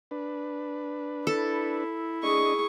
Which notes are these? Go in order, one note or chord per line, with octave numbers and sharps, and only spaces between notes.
D4 B4
E4 A4
D4 G#4 D#5 C#6